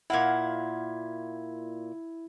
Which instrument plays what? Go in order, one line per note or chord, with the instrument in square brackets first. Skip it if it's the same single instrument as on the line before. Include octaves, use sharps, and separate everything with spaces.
[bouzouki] A#2 F5 F#5 [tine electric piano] E4 G#6